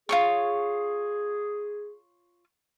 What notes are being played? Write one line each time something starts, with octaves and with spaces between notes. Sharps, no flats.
F4 G#4 C#5 C#6